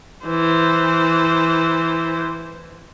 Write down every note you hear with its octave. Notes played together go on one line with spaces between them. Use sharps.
E3 C5